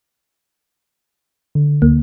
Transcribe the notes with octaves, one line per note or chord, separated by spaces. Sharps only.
D3
D2 A#3